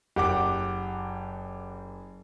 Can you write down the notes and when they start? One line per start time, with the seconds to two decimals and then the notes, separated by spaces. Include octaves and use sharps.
0.16 F#1 G4 F#5 D6